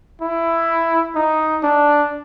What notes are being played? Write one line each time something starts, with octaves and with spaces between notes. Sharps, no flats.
E4
D#4
D4